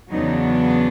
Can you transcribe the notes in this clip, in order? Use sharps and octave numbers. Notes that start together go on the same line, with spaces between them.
E2 C#3 F#3 B3 D4 D#4